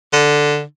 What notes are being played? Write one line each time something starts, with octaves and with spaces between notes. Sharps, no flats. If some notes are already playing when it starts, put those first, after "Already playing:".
D3